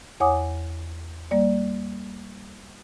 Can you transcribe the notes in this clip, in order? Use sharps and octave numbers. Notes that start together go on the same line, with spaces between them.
E2 C#5 F#5 G#5 D6 D#6
G3 A#3 D5